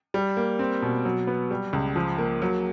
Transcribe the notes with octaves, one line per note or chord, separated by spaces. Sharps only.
G3
A#3
C4
B2
F#3
B3
G3
C#2
F3
A#3
F#3